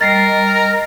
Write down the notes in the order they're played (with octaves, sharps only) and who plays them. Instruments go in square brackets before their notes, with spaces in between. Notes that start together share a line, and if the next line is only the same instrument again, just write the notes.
[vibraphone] G3 D#5 [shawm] A#4 [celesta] A6 C7